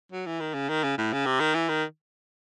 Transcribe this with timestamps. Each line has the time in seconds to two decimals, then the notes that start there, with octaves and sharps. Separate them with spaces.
0.12 F#3
0.26 E3
0.40 D#3
0.54 C#3
0.69 D#3
0.84 C#3
0.98 A2
1.13 C#3
1.26 C3
1.40 D#3
1.54 E3
1.69 D#3